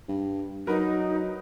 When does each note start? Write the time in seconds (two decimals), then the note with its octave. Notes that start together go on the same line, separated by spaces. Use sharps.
0.08 G2
0.67 F#3 D#4 A#4 B4 F#5